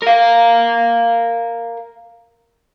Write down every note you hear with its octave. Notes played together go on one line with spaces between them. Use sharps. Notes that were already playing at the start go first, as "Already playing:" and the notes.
A#4 F5